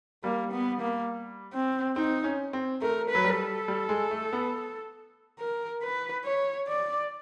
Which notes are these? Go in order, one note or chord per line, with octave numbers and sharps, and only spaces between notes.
G3 A#3
B3
A#3
C4
C4 D#4
C#4
C4
A3 A#4
F#3 B4
G3
A4
G3
G#3
A3
B3
A#4
B4
C#5
D5